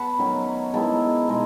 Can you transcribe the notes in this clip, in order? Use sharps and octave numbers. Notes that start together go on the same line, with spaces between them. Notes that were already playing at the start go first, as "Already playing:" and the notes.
Already playing: B3 F#5 A5 B5
D#3 F#3 A3 C#4
D#3 G#3 B3 E4 A5
B2 G#3 D#4